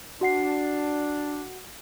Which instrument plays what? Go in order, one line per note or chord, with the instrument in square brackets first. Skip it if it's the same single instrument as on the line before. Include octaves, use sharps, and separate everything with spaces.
[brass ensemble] D4 [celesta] F#4 F#5 C7